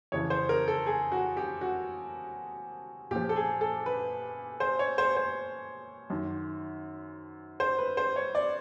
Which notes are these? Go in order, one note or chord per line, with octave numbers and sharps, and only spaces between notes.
F2 C#3 E3 C#5
C5
A#4
A4
G#4
F#4
G4
F#4
A#2 F3 G4
A4
G#4
A4
B4
C5
C#5
C5
C5
F#2 D#3
C5
B4
C5
C#5
D5